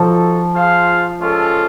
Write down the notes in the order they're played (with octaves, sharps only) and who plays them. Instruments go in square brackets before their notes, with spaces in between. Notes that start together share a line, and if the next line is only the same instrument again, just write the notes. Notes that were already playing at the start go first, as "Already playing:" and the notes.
Already playing: [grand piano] F3 [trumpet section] D#4 F#4 A4
[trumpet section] F4 G#4 C5 F5
G#3 C#4 F4 A4